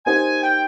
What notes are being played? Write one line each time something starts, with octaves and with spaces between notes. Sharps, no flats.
A#3 D#4 G4 C5 G#5
G5